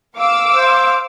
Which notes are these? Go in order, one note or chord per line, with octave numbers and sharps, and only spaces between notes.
F5 D6 E6
C5